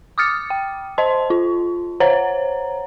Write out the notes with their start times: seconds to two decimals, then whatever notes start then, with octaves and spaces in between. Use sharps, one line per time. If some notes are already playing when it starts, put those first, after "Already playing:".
0.18 D6 D#6 F6 A6 C#7
0.50 G5
0.98 C5 D#5 A5 C6
1.30 F4
2.00 C5 C#5 F#5 A#5